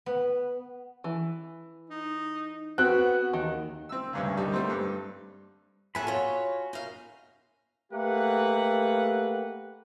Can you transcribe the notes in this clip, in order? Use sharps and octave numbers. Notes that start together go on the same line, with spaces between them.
B3
E3
D#4
B3 C4 F#4 F#6
D#2 D#3
C4 E6
D2 G2 C#3
D3 G3 D#4
G3 A3 C4 C5
G2
F#4 G#4 A4 F#5 G#5 B5
F4 C#5
D#4 F5
A3 A#3 G4 B4 F#5